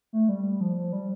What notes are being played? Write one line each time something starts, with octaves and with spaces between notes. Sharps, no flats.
A3
G3
G3
F3
F3
G3